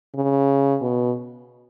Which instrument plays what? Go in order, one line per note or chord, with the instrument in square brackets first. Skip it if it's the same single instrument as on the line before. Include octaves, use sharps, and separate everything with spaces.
[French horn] C#3
B2